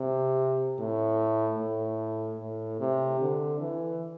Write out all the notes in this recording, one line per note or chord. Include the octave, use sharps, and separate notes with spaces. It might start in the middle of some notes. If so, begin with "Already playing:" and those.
Already playing: C3
A2
A2
A2
C3
D3
E3